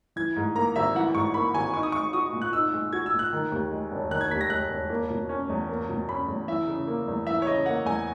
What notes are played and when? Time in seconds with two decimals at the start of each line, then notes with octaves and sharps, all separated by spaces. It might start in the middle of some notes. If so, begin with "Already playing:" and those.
0.16 E3 G#6
0.36 G#2
0.56 A#3 A#5
0.76 G#1 E5
0.95 E3 F#5
1.14 G#2 C#6
1.34 A#3 B5
1.54 G#1 G#5
1.74 D#4 C#6
1.83 D#6
1.92 G#3 C#6
2.13 F#4 D#6
2.33 A#2
2.42 F#6
2.53 D#4 E6
2.73 G#3
2.93 F#4 G#6
3.06 E6
3.13 A#2
3.19 F#6
3.33 D#3
3.52 D#2
3.71 G#3
3.92 E1
4.11 D#3 F#6
4.21 G#6
4.31 D#2 B6
4.41 A#6
4.50 G#3 F#6
4.70 E1
4.90 A#3
5.10 B2
5.29 C#4
5.49 E2
5.69 A#3
5.89 B2
6.09 C#4 B5
6.28 E2
6.48 E3 E5
6.67 C#3
6.87 A#3
7.08 E2
7.27 E3 E5
7.42 C#5
7.47 C#3 D#5
7.66 A#3 F#5
7.85 E2 G#5